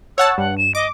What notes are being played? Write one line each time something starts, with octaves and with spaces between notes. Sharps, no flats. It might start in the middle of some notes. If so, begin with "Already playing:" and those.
C#5 F#5 A5 E6
G2 F#5
E7
D#5 D6